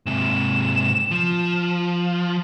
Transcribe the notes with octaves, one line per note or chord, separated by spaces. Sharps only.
G#2 C3 E7
F3